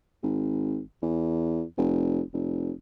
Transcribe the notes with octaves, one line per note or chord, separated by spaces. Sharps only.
G#1
E2
F1
F1